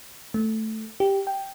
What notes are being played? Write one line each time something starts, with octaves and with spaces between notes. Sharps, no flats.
A3
G4
G5